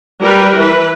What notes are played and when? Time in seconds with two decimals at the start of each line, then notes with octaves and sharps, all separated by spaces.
0.21 G3 A#4 B4
0.57 E3 B4